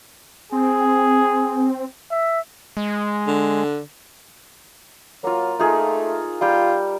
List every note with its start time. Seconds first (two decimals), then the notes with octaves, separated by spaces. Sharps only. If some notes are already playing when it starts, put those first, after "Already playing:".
0.52 C4 G#4
2.11 E5
2.77 G#3
3.27 D3
5.24 F#3 A#3 F4
5.60 A3 D#4 F4 G#4
6.41 G3 F4 G5